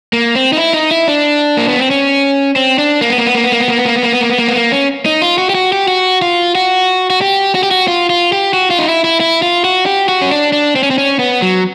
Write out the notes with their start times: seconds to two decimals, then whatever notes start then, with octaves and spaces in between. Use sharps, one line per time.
0.13 A#3
0.35 C4
0.53 D#4
0.57 E4
0.74 D#4
0.91 E4
1.08 D4
1.57 A#3
1.68 B3
1.79 C4
1.90 C#4
2.56 C4
2.78 D4
3.01 A#3
3.10 B3
3.18 A#3
3.27 B3
3.35 A#3
3.43 B3
3.52 A#3
3.60 B3
3.69 A#3
3.77 B3
3.86 A#3
3.96 B3
4.03 A#3
4.13 B3
4.21 A#3
4.30 B3
4.38 A#3
4.48 B3
4.56 A#3
4.72 C#4
5.06 D#4
5.22 F4
5.38 F#4
5.50 G4
5.55 F#4
5.72 G4
5.88 F#4
6.22 F4
6.55 F#4
7.10 F#4
7.21 G4
7.55 F#4
7.63 G4
7.71 F#4
7.88 F4
8.10 F4
8.32 G4
8.54 F#4
8.70 F4
8.79 D#4
8.88 E4
9.04 E4
9.20 E4
9.42 F4
9.65 F#4
9.86 G4
10.09 F#4
10.22 C#4
10.31 D4
10.53 D4
10.76 C4
10.83 C#4
10.91 C4
10.98 C#4
11.19 B3
11.42 F#3